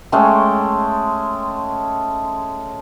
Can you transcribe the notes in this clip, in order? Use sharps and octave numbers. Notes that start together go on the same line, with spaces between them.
G#3 A3 C#4 G5